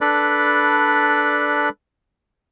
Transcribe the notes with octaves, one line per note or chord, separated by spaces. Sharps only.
D4 A4 B4 D5 B5